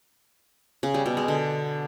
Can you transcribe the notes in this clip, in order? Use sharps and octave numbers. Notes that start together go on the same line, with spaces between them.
C#3
G3
B2
G#3
D3